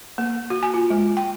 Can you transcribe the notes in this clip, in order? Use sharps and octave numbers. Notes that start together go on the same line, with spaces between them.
A#3
F#4
G#5
F4
G#3
G5